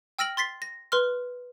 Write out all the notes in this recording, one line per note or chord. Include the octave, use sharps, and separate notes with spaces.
G5 E6 F6 A#6 D7 F#7
C6 A6 B6 C7
A#6
B4 C6 F6